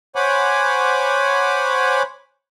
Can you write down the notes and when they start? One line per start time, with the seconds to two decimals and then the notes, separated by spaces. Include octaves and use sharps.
0.16 C5 C#5 F#5 G#5 B5 D6